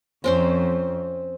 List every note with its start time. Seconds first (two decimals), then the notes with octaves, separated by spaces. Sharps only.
0.24 F2 C4 C#4 C5